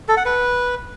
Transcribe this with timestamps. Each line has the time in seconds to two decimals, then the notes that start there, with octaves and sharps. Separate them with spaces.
0.08 A4
0.17 F#5
0.25 B4